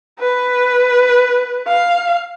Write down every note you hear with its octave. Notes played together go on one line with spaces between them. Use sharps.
B4
F5